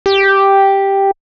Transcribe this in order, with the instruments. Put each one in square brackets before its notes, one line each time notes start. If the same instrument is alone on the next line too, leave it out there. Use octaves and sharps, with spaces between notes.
[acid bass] G4